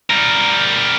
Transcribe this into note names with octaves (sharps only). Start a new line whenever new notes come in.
G3 A#4